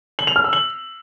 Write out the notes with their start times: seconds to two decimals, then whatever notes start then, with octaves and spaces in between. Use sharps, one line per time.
0.19 F#7
0.27 F7
0.36 F6
0.44 E6
0.53 F#7